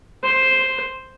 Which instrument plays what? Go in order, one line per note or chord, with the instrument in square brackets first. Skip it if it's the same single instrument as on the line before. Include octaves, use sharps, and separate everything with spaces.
[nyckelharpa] C5